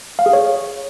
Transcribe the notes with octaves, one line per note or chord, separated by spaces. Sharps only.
F5
G#4
C#5